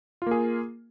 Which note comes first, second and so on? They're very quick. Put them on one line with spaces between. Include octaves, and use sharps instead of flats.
F4 A#3 G#4